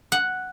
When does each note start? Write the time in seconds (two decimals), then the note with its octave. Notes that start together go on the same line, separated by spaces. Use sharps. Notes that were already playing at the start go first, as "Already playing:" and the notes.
0.12 F#5